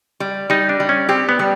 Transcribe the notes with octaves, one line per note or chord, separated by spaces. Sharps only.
G3
G3 D#4
D4
G3
C#4
C4 G4
B3
G3